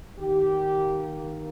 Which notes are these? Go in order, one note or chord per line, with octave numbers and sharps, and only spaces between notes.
D#3 A#3 G4